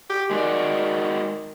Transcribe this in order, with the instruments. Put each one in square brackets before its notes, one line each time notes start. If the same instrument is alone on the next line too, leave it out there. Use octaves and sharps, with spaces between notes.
[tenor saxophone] G4
[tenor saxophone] D#3 [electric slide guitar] G#3 F#4 D5